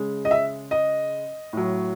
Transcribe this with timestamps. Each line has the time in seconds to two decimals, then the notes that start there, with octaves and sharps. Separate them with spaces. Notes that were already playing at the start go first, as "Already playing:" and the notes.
Already playing: C#3 G#3
0.25 D#5
0.31 E5
0.71 D#5
1.53 A2 F#3